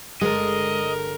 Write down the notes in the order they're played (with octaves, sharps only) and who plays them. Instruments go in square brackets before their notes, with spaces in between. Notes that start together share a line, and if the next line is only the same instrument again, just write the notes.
[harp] G1 A5 [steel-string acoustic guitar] G#3 [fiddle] A#4 [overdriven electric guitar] D#5